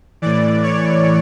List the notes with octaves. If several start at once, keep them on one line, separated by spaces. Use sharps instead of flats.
A2 E3 D5
C#5